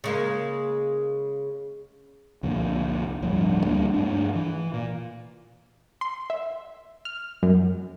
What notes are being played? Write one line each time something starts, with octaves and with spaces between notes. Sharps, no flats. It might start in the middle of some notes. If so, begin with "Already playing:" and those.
C#3 G#3 A#3
C2 F2 A#2 D3
D1 G1 G2 F3
D2 G3 A#3 D4
G2 A3 D4
E3
A#2
C6
E5
F6
F#2